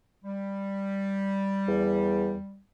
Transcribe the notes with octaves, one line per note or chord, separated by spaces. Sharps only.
G3
E2